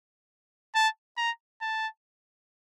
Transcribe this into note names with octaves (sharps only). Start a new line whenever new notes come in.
A5
A#5
A5